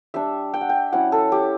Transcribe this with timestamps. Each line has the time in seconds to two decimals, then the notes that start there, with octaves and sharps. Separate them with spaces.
0.14 G3 D4 E5
0.54 G5
0.61 F#5
0.69 G5
0.93 F#3 C#4 E4 F#5
1.12 A4
1.32 G4